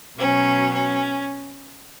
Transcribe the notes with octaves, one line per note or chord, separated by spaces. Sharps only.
B2 F#3 C#4
C#4